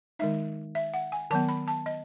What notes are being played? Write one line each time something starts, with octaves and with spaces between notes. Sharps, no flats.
D#3 G#3 D#4 E5
E5
F#5
G#5
D#3 F#3 B3 A5
B5
A5
D#5